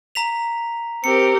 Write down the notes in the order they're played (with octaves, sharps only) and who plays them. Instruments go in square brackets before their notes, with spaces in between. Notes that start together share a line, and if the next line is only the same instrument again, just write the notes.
[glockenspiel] A#5 B6 F7
[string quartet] C4 G4 A#4 [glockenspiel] C#7